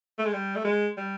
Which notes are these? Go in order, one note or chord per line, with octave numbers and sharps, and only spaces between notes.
A3
G#3
G3
A3
G#3
G3